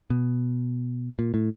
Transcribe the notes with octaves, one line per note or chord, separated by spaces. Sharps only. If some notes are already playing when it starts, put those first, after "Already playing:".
B2
A#2
A2